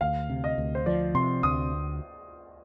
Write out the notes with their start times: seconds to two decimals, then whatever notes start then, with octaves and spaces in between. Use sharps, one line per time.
0.01 D2 F5
0.30 C3
0.44 D#5
0.58 D2
0.75 C5
0.86 F3 D5
1.15 C3 C6
1.43 D2 D#6